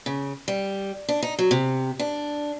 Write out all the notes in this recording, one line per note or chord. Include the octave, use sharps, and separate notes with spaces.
C#3
G3
D4
D#4
F#3
C3
D4